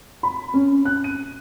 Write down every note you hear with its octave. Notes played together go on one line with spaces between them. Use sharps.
B5
C#4
F#6
D#7